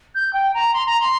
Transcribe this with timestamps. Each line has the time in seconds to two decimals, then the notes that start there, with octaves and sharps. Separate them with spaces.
0.14 G6
0.33 G5
0.53 A#5
0.73 C6
0.86 A#5
1.00 C6